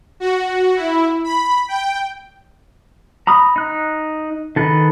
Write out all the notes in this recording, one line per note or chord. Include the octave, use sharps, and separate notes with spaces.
F#4
E4
B5
G5
A#5 B5 D#6
D#4 F#6
D#3 A4 B4